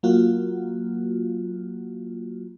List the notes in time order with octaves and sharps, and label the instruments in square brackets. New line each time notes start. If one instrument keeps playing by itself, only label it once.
[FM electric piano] F#3 A#3 F4 F#4